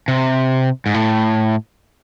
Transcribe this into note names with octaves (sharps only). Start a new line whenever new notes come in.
C3
G#2
A2